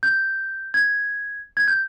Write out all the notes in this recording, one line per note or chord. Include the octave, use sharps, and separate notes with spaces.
G6
G#6
G#6
G6